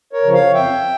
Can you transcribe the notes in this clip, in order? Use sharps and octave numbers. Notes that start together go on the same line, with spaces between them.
A#4 C#5
C#3 F3
C#5 F5
F2 E5 G5